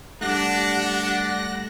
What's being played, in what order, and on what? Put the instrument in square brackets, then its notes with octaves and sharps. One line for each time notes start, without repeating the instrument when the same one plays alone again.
[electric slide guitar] G3 A3 [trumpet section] D4 [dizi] F#5 [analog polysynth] F#6 A#6